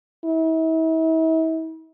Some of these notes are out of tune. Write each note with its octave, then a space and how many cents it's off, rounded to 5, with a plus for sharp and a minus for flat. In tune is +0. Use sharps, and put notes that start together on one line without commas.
E4 -40